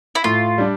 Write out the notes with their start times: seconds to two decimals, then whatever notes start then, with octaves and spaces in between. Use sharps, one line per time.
0.15 E4
0.24 A2 F4
0.58 G3 D4